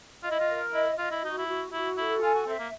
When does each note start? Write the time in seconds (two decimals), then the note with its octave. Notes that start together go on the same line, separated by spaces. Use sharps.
0.23 F4 D#5
0.31 E4
0.40 F4
0.48 A#4
0.73 E4 D#5
0.98 F4 D#5
1.11 E4
1.23 D#4 F#4
1.38 E4
1.47 F#4
1.72 E4 F#4
1.97 E4 A4
2.22 F4 G#5
2.34 F#4
2.47 C4 E5
2.59 A#3